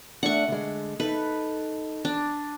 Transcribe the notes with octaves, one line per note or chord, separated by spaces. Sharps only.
A3 D4 F#5 C#6
D3 G#3
D#4 A4 B4
D4